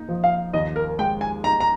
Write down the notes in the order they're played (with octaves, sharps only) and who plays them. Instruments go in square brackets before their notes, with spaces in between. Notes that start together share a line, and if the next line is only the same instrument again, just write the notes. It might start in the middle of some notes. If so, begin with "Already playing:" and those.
Already playing: [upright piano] A#3 D#4
F3
[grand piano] F5
[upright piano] D#2 [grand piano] D#5
[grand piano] A#4
[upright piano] G#3 [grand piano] G5
[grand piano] G#5
[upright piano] D#4 [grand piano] A#5
[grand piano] A#5